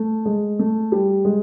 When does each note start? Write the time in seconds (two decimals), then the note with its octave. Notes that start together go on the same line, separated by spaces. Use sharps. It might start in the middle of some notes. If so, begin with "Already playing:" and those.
Already playing: A3
0.25 G#3
0.59 A3
0.92 G3
1.25 G#3